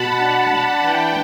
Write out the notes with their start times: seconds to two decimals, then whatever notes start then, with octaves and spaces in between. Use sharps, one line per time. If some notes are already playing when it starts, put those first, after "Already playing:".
Already playing: B2 F#5 A5 B5
0.19 D4
0.35 F#5
0.50 D4
0.81 E3 G5